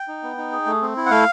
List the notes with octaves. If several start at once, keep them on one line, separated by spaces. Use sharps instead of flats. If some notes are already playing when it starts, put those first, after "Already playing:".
Already playing: G5
D#4
B3
D#4
G#4
A3
C4
E4
F#5
A3 F5